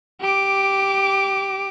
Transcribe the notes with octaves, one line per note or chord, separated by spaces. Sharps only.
G4 D6